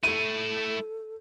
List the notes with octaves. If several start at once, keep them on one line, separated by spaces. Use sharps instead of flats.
A3 E4 A4 D#7